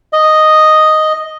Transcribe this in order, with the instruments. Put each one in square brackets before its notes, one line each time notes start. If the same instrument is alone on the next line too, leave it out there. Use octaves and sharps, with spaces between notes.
[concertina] D#5